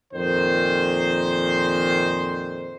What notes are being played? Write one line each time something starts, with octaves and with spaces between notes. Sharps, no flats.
F2 A#2 D#3 C5